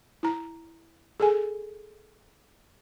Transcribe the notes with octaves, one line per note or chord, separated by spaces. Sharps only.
E4 A#5
G#4 A4 G#5